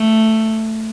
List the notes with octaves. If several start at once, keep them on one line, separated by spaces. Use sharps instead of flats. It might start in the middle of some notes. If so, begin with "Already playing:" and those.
Already playing: A3